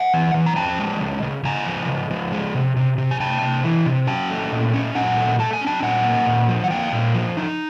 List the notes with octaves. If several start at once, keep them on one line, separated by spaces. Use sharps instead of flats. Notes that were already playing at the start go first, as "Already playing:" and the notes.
Already playing: F#5 G#5
E3
E3
A#5
F3 G5 A5
G#3
C#3
C#3
C#3 G#5 A#5
F3
C#3
F3
G#3
C3
C3
C3
G#5
C3 G5 A5
C3
E3
C3
C#4 G5 A5
A3
A#2
C#4
A#2 F#5 G#5
A3
A3 A5
G#5
C#4
G5 A5
A#2 F#5 G#5
A#3
A#2
F3
F#5
A#3 F5 G5
A#2
F3
D#4